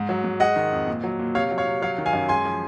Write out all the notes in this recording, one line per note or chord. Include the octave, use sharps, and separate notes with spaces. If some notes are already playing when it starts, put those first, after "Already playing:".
Already playing: G#2
F#3
G#2
G#3 D#5 F#5
D#3
F2
A#2
F#3
A#2
C3 C#5 F5
F#3
C#5 F5
C3
F#3 C#5 F5
D#3
F5 G#5
F#2
G#3 G#5 C6
F3